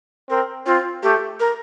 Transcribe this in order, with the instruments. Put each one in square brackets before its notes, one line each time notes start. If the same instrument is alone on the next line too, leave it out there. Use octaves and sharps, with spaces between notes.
[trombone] C4 [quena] A#4
[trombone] C4 [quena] F4
[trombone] A3 [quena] G4
[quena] A#4